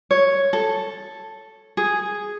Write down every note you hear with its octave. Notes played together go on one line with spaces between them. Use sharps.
C#5
A4
G#4